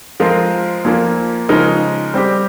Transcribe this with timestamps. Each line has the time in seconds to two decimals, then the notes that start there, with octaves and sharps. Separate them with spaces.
0.20 F3 G#3 C4 F4 A#4
0.85 A#2 F3 A#3
1.49 C#3 F3 G#3 D#4 A#4
2.14 G3 C4 G4